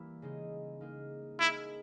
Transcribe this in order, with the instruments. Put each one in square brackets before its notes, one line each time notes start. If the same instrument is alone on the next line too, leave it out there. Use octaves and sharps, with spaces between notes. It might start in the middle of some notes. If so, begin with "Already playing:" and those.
Already playing: [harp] E3 G3 A#3 E4 G4
C#3 G#3 D#4 G#4
A#3 D#4 G#4
[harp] A#3 D#4 G#4 [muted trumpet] E4